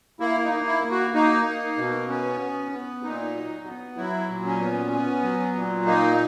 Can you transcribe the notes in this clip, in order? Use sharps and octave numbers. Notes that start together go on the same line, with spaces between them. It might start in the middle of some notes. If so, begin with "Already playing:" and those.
A#3 E4
D#4
A#3
E4
A#3
F#4
A#3 D#4
A#3
B2
B3 C#4
B3
B3
A#2 D#4
F#3
B3
F#3 E4
A#2
C#4
B3
B3
F#3
A#2
A#3 D#4